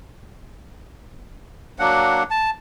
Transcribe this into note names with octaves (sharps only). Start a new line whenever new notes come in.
F#3 A#3 D4 F#5
A5